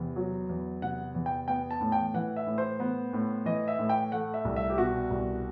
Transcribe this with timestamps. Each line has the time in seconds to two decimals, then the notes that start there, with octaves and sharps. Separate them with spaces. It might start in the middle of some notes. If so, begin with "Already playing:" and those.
Already playing: E2 C3
0.16 F#3
0.49 E2
0.82 C3 F#5
1.15 E2
1.26 G5
1.48 B3 G5
1.71 A5
1.81 A2
1.92 G5
2.14 E3 F#5
2.36 E5
2.46 A2
2.58 C5
2.80 B3
3.13 A2
3.45 E3 D#5
3.68 E5
3.79 A2
3.89 G5
4.12 A3 F#5
4.34 E5
4.45 C2
4.56 E5
4.70 G4
4.78 B2 F#4
5.11 C2